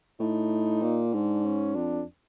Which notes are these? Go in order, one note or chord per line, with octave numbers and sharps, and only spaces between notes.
A2 D#4
A#2
G#2 D4
C#4
F2 D4